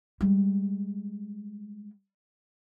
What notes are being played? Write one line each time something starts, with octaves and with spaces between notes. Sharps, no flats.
G3 G#3